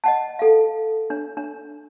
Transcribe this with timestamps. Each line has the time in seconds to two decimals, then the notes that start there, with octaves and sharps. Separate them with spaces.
0.04 D#5 F#5 A5
0.39 A4 F5
1.10 D4
1.37 D4